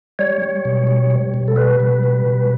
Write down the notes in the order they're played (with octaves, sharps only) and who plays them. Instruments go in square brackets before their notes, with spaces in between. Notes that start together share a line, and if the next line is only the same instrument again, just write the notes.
[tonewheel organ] G3 C#5
G3
B2
G3
G3
B2
A4
G3 B4
B2
G3
B2